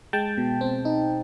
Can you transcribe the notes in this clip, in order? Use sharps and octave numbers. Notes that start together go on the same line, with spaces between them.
G#3 G5 A5
B2
C4
D#4